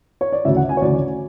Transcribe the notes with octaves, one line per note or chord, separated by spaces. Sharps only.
C#5
D5
D2 C#3 E3 E5
F#5
G#5
C#5
D2 C#3 E3 D5